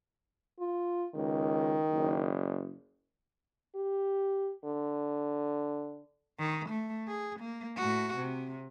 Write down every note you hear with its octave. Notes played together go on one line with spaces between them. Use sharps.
F4
C#2 D#3
F#1
G4
D3
D#3
A3
G#4
A#3
A2 F#4
C3